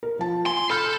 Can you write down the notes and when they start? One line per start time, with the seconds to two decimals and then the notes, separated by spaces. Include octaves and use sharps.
0.03 A#4
0.19 F3 A5
0.46 G#5 C6
0.70 A4 B5 F6 G6